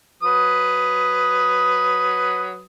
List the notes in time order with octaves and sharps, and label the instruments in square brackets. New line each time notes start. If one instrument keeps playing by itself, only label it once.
[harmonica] F#3 B4 D#6